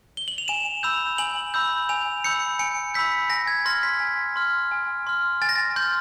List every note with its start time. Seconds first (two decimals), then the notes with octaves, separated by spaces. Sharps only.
0.17 G7
0.28 F#7
0.38 F7
0.48 G#5 E7
0.83 B5 E6 G6 F7
1.18 G#5 F#7
1.54 B5 E6 G6
1.89 G#5 F7
2.24 B5 E6 G6 C#7
2.59 G#5 C#7
2.94 B5 E6 G6 B6
3.30 G#5 A#6
3.47 G#6
3.65 C6 F6 A#6
3.83 B6
4.00 G#5
4.36 C6 F6
4.71 G#5
5.07 C6 F6
5.42 G#5 A6
5.49 A#6
5.55 A6
5.76 C6 G6
5.81 F6